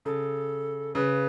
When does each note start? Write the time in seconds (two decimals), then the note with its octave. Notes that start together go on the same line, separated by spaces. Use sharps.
0.05 C#3 A4
0.95 C#3 B4